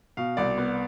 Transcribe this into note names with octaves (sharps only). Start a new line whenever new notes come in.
B2 F5
C2 D5
B3